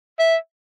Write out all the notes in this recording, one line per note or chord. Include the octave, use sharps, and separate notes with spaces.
E5